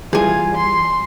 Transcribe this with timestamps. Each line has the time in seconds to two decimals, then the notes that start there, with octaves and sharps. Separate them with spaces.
0.13 E3 G3 F4 G#4 G#5
0.56 C6